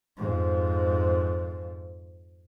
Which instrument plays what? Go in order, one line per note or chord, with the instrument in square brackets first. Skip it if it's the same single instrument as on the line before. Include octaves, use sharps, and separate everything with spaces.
[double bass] F2 G#2